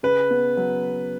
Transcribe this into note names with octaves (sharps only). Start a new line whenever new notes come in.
C#3 B4
B3
F#3